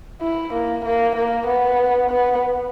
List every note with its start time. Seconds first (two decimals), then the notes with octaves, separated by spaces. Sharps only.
0.22 E4
0.53 A#3
0.85 A#3
1.16 A#3
1.47 B3
2.10 B3